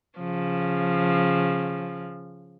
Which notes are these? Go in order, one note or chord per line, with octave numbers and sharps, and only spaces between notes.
C#3 F3